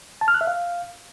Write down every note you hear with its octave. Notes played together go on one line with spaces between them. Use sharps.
A5
F6
F#6
E5
F5